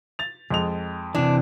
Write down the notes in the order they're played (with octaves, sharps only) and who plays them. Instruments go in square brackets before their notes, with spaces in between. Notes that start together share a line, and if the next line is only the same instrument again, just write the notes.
[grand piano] A6 F7
F2 G#3 F7
[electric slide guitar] C3 E3 [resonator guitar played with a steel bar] D4